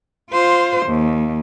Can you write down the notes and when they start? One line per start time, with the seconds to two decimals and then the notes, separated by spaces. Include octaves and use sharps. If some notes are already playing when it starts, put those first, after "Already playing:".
0.31 F4 C5
0.87 D#2